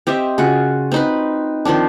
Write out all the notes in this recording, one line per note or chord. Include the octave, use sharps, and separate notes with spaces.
C4 G4 D#5 E5
C#3 F4 F#4
C4 D#4 B4
D#3 F3 C4 D4